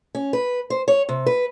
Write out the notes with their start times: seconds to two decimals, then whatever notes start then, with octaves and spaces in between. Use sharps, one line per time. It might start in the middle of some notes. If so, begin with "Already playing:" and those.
0.15 C#4
0.33 B4
0.70 C5
0.88 C#5
1.09 C3
1.26 B4